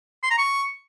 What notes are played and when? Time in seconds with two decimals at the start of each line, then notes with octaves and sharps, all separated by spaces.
0.23 C6
0.30 A#5
0.38 C#6